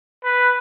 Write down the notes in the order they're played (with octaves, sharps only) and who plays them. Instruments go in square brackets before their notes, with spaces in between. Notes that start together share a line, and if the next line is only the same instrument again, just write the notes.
[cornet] B4